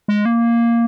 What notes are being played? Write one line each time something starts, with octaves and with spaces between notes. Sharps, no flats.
G#3
A#3